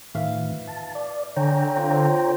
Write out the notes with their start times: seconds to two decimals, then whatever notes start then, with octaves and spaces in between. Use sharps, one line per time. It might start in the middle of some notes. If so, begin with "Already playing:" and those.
0.15 A2 D#3 B4 E5 F5
0.68 A5
0.95 D5
1.37 D3 C#4 C#5 G5 A#5
1.76 C4 F4